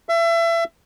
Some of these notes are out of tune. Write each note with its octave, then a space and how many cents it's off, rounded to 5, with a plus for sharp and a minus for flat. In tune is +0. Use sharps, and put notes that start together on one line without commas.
E5 +30